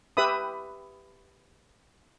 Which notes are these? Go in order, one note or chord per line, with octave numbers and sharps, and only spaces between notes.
G4 B4 E5 B5 D#6